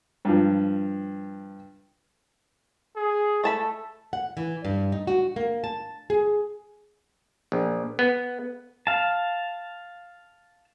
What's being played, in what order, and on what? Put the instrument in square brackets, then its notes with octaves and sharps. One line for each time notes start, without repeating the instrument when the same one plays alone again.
[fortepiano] G2 F3
[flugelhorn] G#4
[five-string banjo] A3 A5 B5 [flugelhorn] A4
[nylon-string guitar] F#5
E3
G2
D#4
F#4
A#3
A5
G#4
[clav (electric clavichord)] A#1
B3
[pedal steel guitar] F5 A5